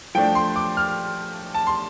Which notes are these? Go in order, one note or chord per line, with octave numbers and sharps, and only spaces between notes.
F3 A3 D4 G5
C6
D6
F6
A5
C6